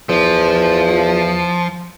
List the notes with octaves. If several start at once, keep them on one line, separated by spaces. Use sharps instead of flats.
E2 F3